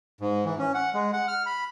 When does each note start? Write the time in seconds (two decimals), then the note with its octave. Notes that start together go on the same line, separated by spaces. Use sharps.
0.21 G#2
0.45 E3
0.59 C#4
0.74 F#5
0.94 G#3
1.13 F#5
1.28 F6
1.46 B5